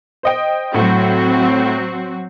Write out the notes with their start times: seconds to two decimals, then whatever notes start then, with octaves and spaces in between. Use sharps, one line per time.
0.23 C5 D#5 G5
0.74 A2 F#3 C4 F#4